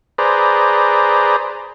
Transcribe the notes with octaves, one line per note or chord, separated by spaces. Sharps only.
G#4 B4 C5 D5 A#5